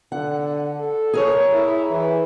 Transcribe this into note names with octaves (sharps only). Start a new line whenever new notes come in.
D3 F#5
A4
G#4 A#4 C#5
E4
E3